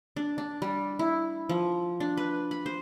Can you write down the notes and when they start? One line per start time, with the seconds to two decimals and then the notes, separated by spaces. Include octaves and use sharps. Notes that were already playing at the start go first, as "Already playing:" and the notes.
0.16 D4
0.38 D4
0.62 G3
0.99 E4
1.49 F3
2.00 D4
2.17 B4
2.51 B5
2.66 C5